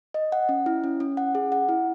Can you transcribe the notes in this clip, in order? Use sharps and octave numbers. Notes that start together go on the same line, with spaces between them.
D#5
F#5
C#4
E4
C#4
C#4
F#5
G#4
F#5
E4